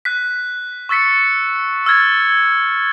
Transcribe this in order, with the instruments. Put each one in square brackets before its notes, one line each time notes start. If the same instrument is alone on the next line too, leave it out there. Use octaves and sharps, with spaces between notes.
[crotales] F#6 B6
C#6 E6 A6 B6 C#7
E6 F6 G#6 A6